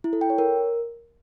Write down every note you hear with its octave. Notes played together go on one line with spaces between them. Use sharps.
E4
A4
G5
C#5
A#4